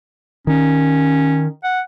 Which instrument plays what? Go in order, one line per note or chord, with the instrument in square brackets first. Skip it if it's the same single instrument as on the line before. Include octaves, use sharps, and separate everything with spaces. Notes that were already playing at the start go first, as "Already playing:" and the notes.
[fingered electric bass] D#3 [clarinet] C#4
[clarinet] F#5